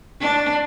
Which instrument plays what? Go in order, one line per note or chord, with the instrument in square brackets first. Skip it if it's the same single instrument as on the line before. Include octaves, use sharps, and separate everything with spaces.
[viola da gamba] D4